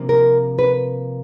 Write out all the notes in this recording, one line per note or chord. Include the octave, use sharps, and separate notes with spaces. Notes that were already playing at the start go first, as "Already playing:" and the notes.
Already playing: C3 F3 A#3 D4
A#4
B4